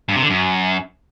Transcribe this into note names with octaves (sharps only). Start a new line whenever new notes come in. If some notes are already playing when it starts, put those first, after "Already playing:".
G2
C3
D3
F#2